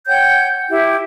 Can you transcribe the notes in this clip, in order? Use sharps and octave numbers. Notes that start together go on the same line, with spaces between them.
C#5 F#5 G5 G6
E4 G4